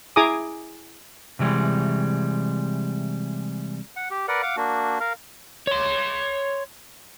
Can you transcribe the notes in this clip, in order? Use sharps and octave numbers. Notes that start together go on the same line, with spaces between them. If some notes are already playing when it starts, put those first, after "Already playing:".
E4 G#4 G#5 A#5 D6 D#6
C3 E3 G3 G#3
F#5
G4
A#4 B4 D5 F#5
F5 F#5 D6
A#3 D4 F#4
A#4 F5
C#5 C6